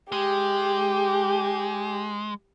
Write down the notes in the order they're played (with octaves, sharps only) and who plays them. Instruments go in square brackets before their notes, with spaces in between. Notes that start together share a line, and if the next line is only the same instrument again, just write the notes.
[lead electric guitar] G#3 [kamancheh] G4